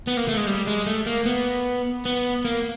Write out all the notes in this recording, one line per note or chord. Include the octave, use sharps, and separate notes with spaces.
B3
A#3
A3
G#3
G3
G#3
A3
A#3
B3
B3
A#3